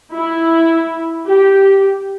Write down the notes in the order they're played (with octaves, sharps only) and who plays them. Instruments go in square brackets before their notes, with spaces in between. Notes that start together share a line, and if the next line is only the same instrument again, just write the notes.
[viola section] E4
G4